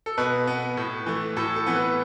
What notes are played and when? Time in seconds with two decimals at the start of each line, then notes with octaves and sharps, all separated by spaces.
0.06 A4
0.18 B2 B4
0.47 B3
0.77 A2
1.06 E3 A3
1.37 A2 A4
1.56 A4
1.67 E3 B3
1.75 B4